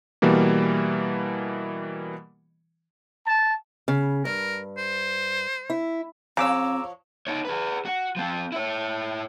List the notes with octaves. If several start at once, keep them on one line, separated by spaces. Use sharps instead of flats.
B2 E3 G3 A#3
A5
C#3
G2 A#4
C5
E4
C#3 F3 C4 C#5 A#5 D6 E6
D#4 C#5
G#4 B4
F#4
F3 C4
E4 C#5